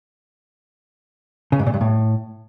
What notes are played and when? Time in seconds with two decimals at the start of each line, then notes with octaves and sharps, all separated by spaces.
1.52 C#3
1.59 G#2
1.66 A#2
1.74 G2
1.81 A2